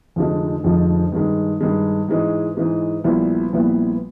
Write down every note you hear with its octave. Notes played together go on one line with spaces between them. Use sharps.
F1 F2 D3 F3 G#3
F1 F2 D3 F3 G#3
G2 D#3 G#3
G2 D#3 G#3
G#2 E3 G#3
G#2 E3 G#3
A#1 A#2 G3 B3 E4
A#1 A#2 G3 B3 E4